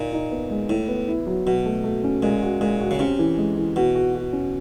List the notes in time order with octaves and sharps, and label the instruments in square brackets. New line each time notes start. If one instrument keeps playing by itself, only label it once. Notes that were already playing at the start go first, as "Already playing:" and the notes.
Already playing: [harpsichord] A#2 [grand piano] D#4
[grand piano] D#4
B3
G#3
[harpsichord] A2 [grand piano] E4
[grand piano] B3
E4
F#3
[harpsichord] B2 [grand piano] F#3
[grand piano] A3
A3
C#4
[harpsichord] A#2 [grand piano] G#3
[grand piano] F#4
[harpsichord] A#2 [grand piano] G#3
[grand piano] F#4
[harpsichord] C#3
[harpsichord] C3 [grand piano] C#4
[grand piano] E3
G#3
E3
[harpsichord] B2 [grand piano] F#4
[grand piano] F#4
F#4
C#4